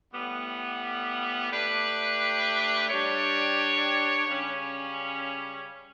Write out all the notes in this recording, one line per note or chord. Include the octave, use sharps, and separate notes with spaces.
A2 G3 B3
A3 D4 G4 B4
G3 D4 G4 C#5
C#3 G3 C#4